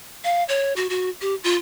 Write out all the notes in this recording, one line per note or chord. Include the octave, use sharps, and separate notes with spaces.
F5
C#5
F#4
F#4
G4
F4